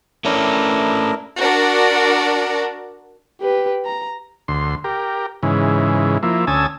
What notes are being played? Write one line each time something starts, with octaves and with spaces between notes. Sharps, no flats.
A3 C#4 D4 E4 A#4 C#5
D4 F#4 A#4 D5
G4 B4
A#5
D2 C6
G4 A#4
G#2 C#3 E3
F3 A#3 E4
D2 C#4 G#5 A5 D#6 E6